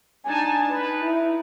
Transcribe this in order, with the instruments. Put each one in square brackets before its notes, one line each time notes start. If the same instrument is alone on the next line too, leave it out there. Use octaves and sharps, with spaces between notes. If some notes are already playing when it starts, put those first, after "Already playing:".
[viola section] D4 D#4 A5 [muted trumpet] G#5
[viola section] D#4 [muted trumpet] B4
[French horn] E4